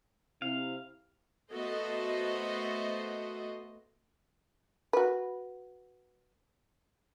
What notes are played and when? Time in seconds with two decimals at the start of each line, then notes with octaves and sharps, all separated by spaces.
0.42 C3 C4 E4 F5
1.51 A3 B3 F#4 A4 C5 D#5
4.93 F#4 B4